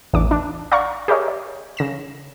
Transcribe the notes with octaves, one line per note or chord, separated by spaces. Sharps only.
A1 E2 D4 D6
D4
D5 F5 F#5 A#5 C#6
G4 G#4 A#4 C#5 D#5
D5
C#3 A#6 E7